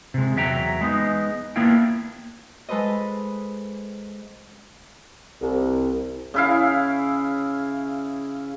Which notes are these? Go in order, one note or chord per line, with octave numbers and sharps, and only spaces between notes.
C3 G#3
E2 F#3 E5 G5 A#5
G#3 B3 D#4
A#3 B3 D4 E4 F4 G5
G#3 A4 B4 C5 D#5
C2
C#3 E4 F5